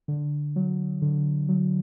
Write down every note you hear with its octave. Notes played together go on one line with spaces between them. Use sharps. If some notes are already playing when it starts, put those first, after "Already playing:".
D3
F#3
D3
F#3